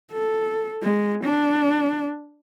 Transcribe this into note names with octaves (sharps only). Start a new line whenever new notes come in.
A4
G#3
D4